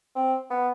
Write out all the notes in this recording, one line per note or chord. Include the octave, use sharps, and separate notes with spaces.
C4
B3